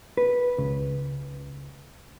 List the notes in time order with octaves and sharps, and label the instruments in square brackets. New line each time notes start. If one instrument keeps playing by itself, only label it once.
[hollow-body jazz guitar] B4
[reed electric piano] C#2 C#3